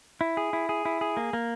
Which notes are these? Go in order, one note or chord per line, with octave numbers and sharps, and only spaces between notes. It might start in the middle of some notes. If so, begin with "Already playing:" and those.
E4
G#4
E4
G#4
E4
G#4
A#3
A#3